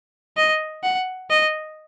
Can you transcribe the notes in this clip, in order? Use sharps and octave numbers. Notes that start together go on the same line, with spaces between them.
D#5
F#5
D#5